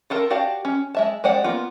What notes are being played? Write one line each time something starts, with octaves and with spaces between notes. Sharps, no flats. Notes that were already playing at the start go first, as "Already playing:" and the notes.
F4 A4 A#4 A5
F#4 G4 D5 F5 A5
C#4
G#3 E5 A5
G#3 G4 C5 D5 F#5
A#3 B3 F4 B4